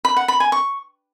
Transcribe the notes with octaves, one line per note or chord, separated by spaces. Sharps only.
B5
F#5
B5
G#5
C#6